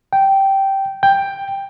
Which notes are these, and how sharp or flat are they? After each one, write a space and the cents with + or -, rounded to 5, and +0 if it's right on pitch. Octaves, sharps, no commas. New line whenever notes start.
G5 -10
G5 +10